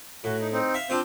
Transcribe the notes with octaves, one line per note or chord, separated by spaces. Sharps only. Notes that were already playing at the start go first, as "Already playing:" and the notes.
A2 F#4
D#4
C4 D#4
E5 F5
C4 D4 F4 C5